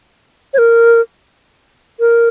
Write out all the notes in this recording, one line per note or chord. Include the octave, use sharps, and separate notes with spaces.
C#5
A#4
A#4